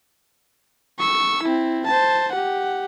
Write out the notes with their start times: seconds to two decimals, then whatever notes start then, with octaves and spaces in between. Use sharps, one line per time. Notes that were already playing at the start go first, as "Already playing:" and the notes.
0.99 C#6 E6
1.43 C4 E4
1.86 C5 A5
2.32 G4 F#5